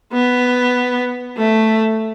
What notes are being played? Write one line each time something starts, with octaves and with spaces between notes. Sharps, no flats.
B3
A3